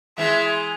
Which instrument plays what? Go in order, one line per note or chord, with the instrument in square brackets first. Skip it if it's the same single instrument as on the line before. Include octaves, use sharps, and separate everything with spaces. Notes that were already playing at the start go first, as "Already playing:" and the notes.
[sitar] E3 G#3 [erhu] E5